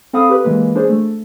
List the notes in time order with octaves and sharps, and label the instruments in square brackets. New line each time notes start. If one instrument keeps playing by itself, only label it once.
[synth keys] C4 A4 F5 B5 D#6
G4 B4
E3 G#3 A#3 B4
D4 G#4 C5
A3